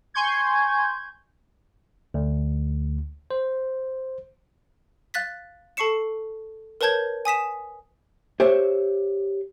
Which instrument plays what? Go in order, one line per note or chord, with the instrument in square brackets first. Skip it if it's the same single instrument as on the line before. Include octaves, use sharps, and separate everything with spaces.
[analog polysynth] G#5 C6 C#6 G6 G#6
[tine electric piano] D2
C5
[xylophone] F5 F#6 A6 B6
A4 A5 C#6 C7 C#7 E7
A#4 B4 C#5 A5 G6 G#6
G#5 D#6 B6 E7
[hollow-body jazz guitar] G4 C5 C#5 E5